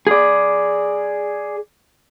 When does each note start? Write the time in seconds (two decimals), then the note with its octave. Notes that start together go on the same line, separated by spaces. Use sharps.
0.07 G#4 D5